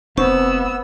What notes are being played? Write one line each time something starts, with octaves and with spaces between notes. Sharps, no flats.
F1 B3 C4 C5 C#6 E6